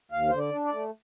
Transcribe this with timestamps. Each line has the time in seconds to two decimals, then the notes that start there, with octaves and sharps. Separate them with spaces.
0.12 D#2 F5
0.29 D3 C5
0.38 D5
0.51 D4
0.65 D5
0.72 A3